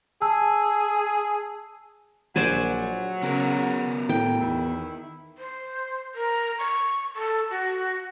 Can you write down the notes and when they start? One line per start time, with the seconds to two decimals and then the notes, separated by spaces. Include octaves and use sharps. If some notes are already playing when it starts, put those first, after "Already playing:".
0.22 G#4 A5 E6
2.36 A#1 F#3 C5 D5 G#5
3.23 C#3 B3 F#4 A#4
4.09 A2 G5
4.41 E2 D#3 E4
5.38 C5
6.15 A#4
6.59 C#6
7.16 A4
7.50 F#4